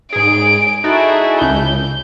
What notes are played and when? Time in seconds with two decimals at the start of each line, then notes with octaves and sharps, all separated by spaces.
0.13 G#2 G#4 D7
0.84 D#4 E4 F#4 G#4 A4
1.41 C#2 G6